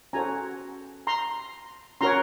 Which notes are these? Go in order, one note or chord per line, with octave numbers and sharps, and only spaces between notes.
C#4 F#4 A4 C5 G#5 A#5
A#5 C6
C#4 F#4 A#4 C#5 A#5 C6